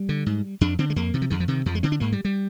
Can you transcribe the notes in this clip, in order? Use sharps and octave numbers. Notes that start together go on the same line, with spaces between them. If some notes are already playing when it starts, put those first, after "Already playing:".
Already playing: G3
D3
G#2
F2 D4
D3 C4
G#3
F2 A#3
C3 D#3
F3
F2 D#3
F3
C3 D#3
F2 F3
G#3
D3 C4
D4
G#2 A#3
G3
G3